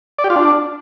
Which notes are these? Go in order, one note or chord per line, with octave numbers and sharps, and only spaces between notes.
D5
G4
F4
D4